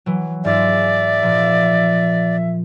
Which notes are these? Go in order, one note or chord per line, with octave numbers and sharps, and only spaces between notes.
E3 F#3
G#2 F4 D5 E5
A#2 F3